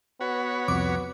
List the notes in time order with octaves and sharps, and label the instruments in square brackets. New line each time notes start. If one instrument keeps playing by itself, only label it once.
[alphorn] B3 [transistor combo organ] F#4 C#5 B5
[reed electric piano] C2 F2 [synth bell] D6